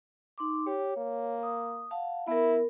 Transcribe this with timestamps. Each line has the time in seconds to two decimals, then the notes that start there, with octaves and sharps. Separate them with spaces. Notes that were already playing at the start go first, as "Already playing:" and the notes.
0.38 D#4 C6 D6
0.67 G4 C#5
0.97 A#3
1.43 D#6
1.91 F5 F#5 A5
2.28 B3 E4 A#4